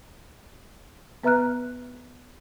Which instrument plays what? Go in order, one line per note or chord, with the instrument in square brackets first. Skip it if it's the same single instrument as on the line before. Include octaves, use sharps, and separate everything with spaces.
[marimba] B3 B4 E5 A#5 F6 F#6